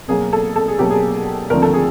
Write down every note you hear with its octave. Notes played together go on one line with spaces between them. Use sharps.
B2 F#3 A#3 G#4
A4
A4
G#4
B2 F#3 A#3 G4
G#4
D#2 D3 F3 A3 C4 A#4
A4
G#4